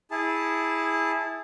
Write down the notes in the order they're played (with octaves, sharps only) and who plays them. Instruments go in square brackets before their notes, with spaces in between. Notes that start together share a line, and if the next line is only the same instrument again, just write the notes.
[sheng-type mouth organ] E4 G#4 A5